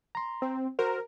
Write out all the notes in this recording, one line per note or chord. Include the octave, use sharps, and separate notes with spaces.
A#5 C6
C4
F#4 A#4 C5